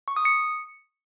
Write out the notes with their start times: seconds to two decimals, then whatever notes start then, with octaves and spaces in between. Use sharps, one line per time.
0.08 C#6
0.16 D#6
0.25 C#7